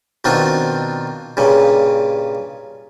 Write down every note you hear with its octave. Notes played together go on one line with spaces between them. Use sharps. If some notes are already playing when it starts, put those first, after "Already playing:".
B2 D#3 C4 D4 F4
G2 A#2 C#3